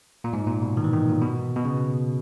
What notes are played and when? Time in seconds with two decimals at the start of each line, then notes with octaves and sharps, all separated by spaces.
0.24 A#2
0.33 G#2
0.47 A#2
0.62 B2
0.77 D#3
0.84 E3
0.93 D#3
1.09 A#2
1.22 B2
1.56 B2
1.65 C#3